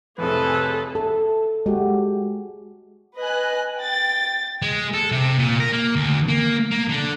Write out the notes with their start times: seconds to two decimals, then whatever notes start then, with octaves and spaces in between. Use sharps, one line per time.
0.18 F2 A2 C3 G#4 A4 B4
0.95 A4
1.66 G#3 F#4 G4
3.19 B4 D#5 G#5 F#6
3.77 G5 A6
4.62 G#3
4.94 A4
5.12 C3
5.39 A#2
5.60 A#4
5.73 A#3
5.96 D2
6.28 A#3
6.71 A#3
6.89 D3